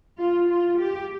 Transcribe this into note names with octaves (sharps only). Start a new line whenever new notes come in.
F4
F4
G4